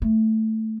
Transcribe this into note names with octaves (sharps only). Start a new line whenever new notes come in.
A3